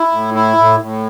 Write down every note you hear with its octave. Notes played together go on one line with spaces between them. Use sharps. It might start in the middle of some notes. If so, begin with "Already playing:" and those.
Already playing: E4
A2
E4
A2
A2